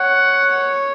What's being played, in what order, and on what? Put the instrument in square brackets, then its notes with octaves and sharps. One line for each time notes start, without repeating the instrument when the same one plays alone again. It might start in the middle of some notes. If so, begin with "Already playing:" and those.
Already playing: [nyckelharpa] C#5 [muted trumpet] F#5